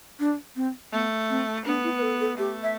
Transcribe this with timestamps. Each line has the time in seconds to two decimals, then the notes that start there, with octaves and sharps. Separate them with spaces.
0.20 D4
0.56 C4
0.92 A3 B3
1.30 C4
1.66 B3 D4
1.84 E4
1.98 B4
2.02 A4
2.21 A4
2.38 A3 G4
2.63 E5